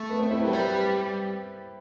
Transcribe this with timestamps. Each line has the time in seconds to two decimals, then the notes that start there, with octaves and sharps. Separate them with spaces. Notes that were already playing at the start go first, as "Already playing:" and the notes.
Already playing: A3
0.10 B3
0.19 C4
0.31 C4 E4
0.42 G4 B4
0.45 F#3
0.53 G3 G4 B4